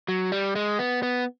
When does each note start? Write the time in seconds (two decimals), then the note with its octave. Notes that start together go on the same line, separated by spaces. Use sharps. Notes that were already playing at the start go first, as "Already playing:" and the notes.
0.08 F#3
0.32 G3
0.56 G#3
0.79 B3
1.03 B3